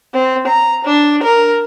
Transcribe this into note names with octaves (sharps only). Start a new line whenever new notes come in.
C4
A#5
D4
A#4